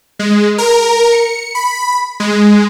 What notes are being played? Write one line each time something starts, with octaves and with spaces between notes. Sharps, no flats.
G#3
A#4
C#7
B5
G#3